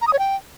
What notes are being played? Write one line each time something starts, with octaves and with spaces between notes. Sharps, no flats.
A#5
D#6
C#5
G5